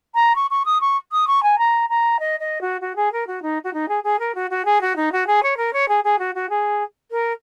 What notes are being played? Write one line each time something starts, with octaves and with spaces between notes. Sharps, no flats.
A#5
C#6
C#6
D#6
C#6
D#6
C#6
G#5
A#5
A#5
D#5
D#5
F#4
F#4
G#4
A#4
F#4
D#4
F#4
D#4
G#4
G#4
A#4
F#4
F#4
G#4
F#4
D#4
F#4
G#4
C#5
A#4
C#5
G#4
G#4
F#4
F#4
G#4
A#4